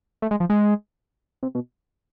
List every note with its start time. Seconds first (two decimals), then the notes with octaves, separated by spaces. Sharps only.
0.22 A3
0.31 G#3
0.40 F3
0.49 G#3
1.43 C3
1.55 B2